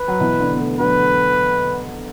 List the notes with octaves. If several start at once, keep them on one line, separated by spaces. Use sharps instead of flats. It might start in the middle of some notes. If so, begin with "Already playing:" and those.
Already playing: B4
F#3
B2 E3
D3
B3
E3 A3
D3 F#3 B4